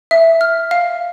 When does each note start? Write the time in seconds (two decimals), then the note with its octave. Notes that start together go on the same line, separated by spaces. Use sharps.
0.11 E5
0.41 F6
0.71 F5